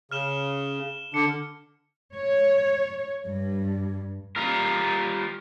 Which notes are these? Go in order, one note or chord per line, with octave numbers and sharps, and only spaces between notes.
C#3 F6 E7 G7
D3 D4 C#7
C#5
G2
G3 F4 A#4